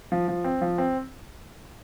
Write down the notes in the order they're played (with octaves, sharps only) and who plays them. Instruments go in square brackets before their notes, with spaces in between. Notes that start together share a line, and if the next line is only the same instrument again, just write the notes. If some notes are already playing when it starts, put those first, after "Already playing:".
[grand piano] F3
F3
C4
F3
C4